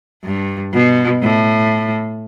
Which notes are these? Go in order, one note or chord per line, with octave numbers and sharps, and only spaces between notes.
G2
B2
A2